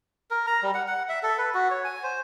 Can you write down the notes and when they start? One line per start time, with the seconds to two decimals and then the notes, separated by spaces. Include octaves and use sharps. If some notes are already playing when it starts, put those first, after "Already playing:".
0.31 A#4
0.47 A#5
0.63 G3
0.74 F#5
0.87 F#5
1.09 E5
1.23 A4
1.38 B4
1.54 F#4
1.71 C#5
1.84 G#5
2.03 C5